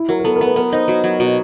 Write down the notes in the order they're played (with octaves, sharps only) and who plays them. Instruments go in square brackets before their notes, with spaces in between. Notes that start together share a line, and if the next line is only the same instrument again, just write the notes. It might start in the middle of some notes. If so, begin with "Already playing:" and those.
Already playing: [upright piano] E4
[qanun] F#3 [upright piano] A#4
[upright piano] A#4
[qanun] B3 [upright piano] A4
[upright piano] A#4
[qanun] B3 [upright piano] B4
[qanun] B3 [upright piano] A#4
[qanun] D#4 [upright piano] C5
[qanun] F#3 [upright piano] C5
[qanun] F#3
B2